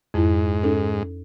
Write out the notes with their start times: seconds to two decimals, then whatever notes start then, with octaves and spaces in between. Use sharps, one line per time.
0.14 F2 G#2 E4
0.63 C#4 D#4 A4